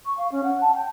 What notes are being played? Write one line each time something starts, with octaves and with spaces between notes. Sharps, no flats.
C#6
F5
C#4
F#5
A5
G5